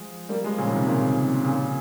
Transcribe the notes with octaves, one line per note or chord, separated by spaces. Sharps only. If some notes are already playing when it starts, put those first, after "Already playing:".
Already playing: F3 G#3
G3 A#3
F3 G#3
A#2 C#3
C3 D#3
A#2 C#3
A#2 C#3